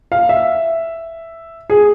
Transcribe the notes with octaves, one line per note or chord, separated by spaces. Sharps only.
F5
E5
G#4